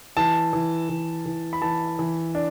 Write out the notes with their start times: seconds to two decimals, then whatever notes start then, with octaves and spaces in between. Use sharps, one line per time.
0.17 E3 A5
0.53 E3
0.89 E3
1.26 E3
1.53 B5
1.62 E3 A5
1.99 E3
2.35 D4